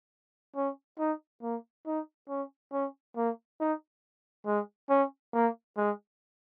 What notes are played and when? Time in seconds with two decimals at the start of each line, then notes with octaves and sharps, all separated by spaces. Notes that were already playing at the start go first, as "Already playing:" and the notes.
0.56 C#4
0.99 D#4
1.42 A#3
1.86 D#4
2.29 C#4
2.72 C#4
3.16 A#3
3.60 D#4
4.46 G#3
4.90 C#4
5.34 A#3
5.77 G#3